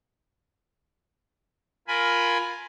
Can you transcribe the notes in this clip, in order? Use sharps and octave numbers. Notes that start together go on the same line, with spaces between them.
F4 A#4 G#5 B5